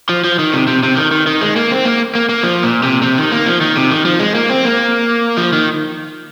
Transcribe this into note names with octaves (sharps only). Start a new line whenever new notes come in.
F3
F3
D#3
C3
C3
C3
D#3
D#3
D#3
G#3
A#3
C4
A#3
A#3
A#3
F3
A#2
C3
C3
D#3
A#3
F3
D#3
C3
D#3
F3
G#3
A#3
C4
A#3
F3
D#3